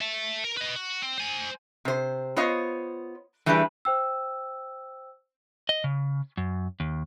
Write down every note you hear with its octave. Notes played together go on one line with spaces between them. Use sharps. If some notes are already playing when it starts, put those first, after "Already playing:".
E5 A5
A#4
B4 D#5
F#4
C4
C5 G#5
C3 C5
B3 F4 C5 C#5 D#5
E3 G3 A3 D4 G#4 B4
C5 G5 E6
D#5
C#3
F#2
D#2